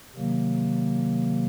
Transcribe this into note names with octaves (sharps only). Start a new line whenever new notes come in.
C3 D#3 F#3 A#3